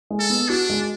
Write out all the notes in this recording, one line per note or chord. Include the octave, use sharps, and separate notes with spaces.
G#3
A4
B3
D4 F#4
G#3